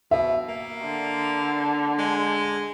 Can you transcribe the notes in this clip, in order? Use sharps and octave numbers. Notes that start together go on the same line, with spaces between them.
B2 E5
A#3
D3
G#3